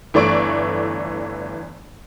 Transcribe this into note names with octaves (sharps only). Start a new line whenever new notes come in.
G1 E3 A3 D5 C#6 D7